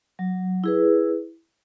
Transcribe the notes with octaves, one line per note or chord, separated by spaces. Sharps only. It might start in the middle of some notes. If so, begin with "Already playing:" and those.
F#3
E4 G#4 B4